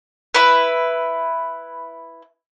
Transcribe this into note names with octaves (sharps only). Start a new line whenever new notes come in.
E4 B4